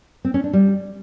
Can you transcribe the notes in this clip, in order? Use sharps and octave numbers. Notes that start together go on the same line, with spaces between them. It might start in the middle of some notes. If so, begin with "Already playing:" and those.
C4
C#4
D4
G3